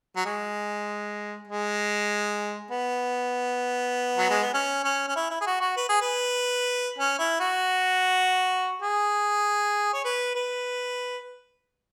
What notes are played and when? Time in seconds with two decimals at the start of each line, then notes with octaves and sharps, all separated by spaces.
0.16 F#3
0.25 G#3
1.48 G#3
2.71 B3
4.18 F#3
4.30 G#3
4.41 B3
4.54 C#4
4.84 C#4
5.08 C#4
5.16 E4
5.30 E4
5.41 G#4
5.47 F#4
5.61 F#4
5.77 B4
5.89 G#4
6.01 B4
6.98 C#4
7.19 E4
7.40 F#4
8.82 G#4
9.93 C#5
10.04 B4
10.35 B4